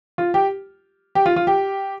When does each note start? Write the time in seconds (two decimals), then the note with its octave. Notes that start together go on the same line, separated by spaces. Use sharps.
0.18 F4
0.34 G4
1.15 G4
1.26 F4
1.36 F4
1.47 G4